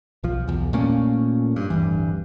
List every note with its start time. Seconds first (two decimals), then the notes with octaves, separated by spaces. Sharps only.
0.24 B1 F3
0.48 B1 E2
0.73 A#2 A3 A#3 C#4
1.56 G2
1.70 D1 G2 E3